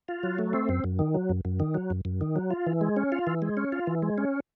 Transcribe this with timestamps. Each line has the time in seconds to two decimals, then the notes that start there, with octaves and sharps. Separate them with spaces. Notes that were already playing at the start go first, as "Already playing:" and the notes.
0.08 F4
0.23 F#3
0.39 A3
0.53 C4
0.69 F#2
0.84 F#2
0.99 D#3
1.14 F#3
1.29 F#2
1.45 F#2
1.60 D#3
1.75 F#3
1.90 F#2
2.05 F#2
2.21 D#3
2.36 F#3
2.51 F4
2.66 E3
2.81 G#3
2.97 C#4
3.12 F4
3.27 E3
3.42 G#3
3.57 C#4
3.72 F4
3.87 E3
4.02 G#3
4.18 C#4